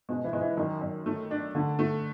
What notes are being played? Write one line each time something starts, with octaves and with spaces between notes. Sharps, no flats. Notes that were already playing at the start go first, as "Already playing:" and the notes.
B2 G#3
E3
G#3
E3
F#2 D#3
F#2
A3
D4
D3 A3
A3